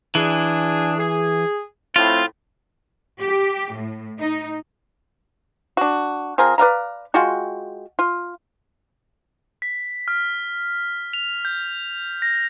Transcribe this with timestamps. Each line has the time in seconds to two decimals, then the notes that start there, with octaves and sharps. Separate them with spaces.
0.15 E3 D4 G#4
0.99 G#4
1.96 A2 C4 F4
3.19 G4
3.73 A2
4.19 D#4
5.77 D4 F#4
6.38 F3 C4 G#4 A#4
6.58 B4 D5 F5 A#5
7.14 G#3 F4 F#4 G5
7.99 F4
9.62 B6
10.08 F6
11.13 F7
11.45 G6
12.22 A#6